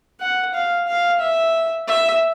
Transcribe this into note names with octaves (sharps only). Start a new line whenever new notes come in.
F#5
F5
F5
E5
E5